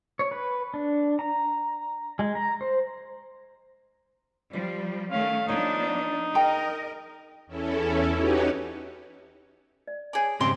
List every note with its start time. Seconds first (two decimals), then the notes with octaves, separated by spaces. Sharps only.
0.19 C#5
0.31 B4
0.74 D4
1.19 A#5
2.19 G#3
2.35 A#5
2.61 C5
4.53 F3 G3 D5
5.11 D#3 A3 C#4 F5
5.48 F3 B3 D4 D#4 C#5
6.35 G#4 A#4 D#5 G5 A#5
7.46 E2 C#4 E4 A4
8.12 C#4 D#4 F#4 G4 B4 C#5
9.87 D5
10.13 G#4 C#5 D5 G#5 A5
10.40 G#2 C#3 C4 G4 D#5 C6